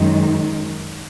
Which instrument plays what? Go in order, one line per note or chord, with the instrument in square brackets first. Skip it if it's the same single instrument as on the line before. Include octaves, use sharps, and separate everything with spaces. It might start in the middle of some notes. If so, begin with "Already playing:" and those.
Already playing: [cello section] F#2 D#3 G#3 D#4